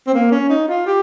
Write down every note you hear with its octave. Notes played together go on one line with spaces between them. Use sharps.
C4
A#3
C#4
D#4
F4
G4